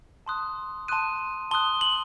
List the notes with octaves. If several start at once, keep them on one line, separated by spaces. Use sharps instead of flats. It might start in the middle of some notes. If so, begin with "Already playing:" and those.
A5 C6 D#6 F#6
A5 C6 D#6 F#6 D#7
A5 C6 D#6 F#6 G7
F#7